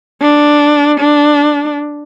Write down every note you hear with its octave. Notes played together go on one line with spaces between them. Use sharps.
D4
D4